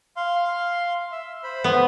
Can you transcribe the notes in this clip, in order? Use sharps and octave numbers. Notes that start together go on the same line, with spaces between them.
F5 C6
E5
C5 B5
B3